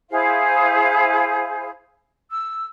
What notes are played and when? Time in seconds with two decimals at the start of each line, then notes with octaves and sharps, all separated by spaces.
0.10 E4 G#4 C5 F5
2.29 E6